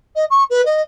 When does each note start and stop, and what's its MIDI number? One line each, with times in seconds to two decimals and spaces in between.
0.16 0.25 75
0.31 0.44 85
0.50 0.64 71
0.65 0.82 75